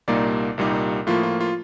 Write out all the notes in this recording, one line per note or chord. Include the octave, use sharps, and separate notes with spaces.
C2 A#2 G3 A#3 D#4 D5
C2 A#2 G3 A#3 D#4
A2 F3 A#3 F4
F4
F4